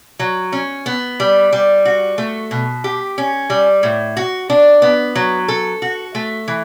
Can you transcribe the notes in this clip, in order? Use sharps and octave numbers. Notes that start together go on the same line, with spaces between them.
F#3
C#4
B3
G3
G3
F#4
A3
B2
G4
C#4
G3
A2
F#4
D4
B3
F#3
A4
F#4
A3
E3